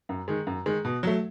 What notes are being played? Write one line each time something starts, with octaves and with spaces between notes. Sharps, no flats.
F#2
D#3 G#3
F#2
D#3 G#3
B2
F#3 A3